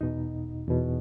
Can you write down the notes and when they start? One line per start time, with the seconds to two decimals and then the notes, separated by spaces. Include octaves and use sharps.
0.01 E2 B2 D#4
0.68 E2 B2